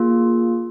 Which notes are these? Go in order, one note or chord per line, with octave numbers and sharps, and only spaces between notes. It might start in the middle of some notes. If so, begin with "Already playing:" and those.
Already playing: A#3 F4 G#4